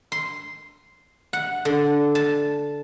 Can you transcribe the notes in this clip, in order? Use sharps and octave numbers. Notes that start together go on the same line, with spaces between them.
C6
F#5
D3
A5